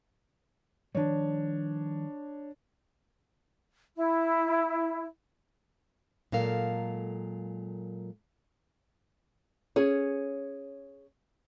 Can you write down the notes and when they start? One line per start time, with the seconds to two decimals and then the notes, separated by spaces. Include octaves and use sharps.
0.95 D#3 F3 G3 D4 C#5
3.95 E4
6.32 A#2 F#3 G#3 A4 A#4 F5
9.76 C#4 G#4 C#5